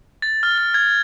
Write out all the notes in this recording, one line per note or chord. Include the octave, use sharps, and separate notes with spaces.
A6
F6
F6
G#6